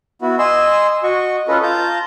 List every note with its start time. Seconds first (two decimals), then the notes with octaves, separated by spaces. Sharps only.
0.22 B3 E4 F#4
0.39 D#5 G#5 C6 E6
1.03 F#4 D#5 C#6
1.48 C#4 F4 A4 B4 D#5
1.63 F4 A5 A#5 G6